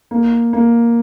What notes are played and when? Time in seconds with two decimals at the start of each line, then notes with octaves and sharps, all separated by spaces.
0.11 A#3
0.53 A#3